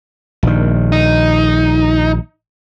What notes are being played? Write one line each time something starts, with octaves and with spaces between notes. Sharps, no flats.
A#1 D#3
D#4